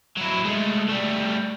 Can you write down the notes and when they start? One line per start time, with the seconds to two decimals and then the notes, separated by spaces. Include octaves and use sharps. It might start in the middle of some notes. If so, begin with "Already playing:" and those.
0.17 F#3 E4
0.45 G#3 A3
0.88 G3 A3